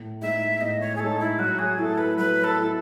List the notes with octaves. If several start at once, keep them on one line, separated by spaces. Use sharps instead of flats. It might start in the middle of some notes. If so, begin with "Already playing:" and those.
Already playing: A2
G#3 D#4 E5
A2 D#5
C#5
G#4
G#3 D#4 A4
E4
F#3 F#4
G#4
A3 E4 A4
B4
F#3 B4
A4
A3 E4